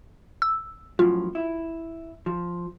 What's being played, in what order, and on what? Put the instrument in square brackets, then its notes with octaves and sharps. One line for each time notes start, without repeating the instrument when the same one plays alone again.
[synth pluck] E6
[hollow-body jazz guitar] F#2 A2 F3 [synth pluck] F4
[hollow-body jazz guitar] E4
F3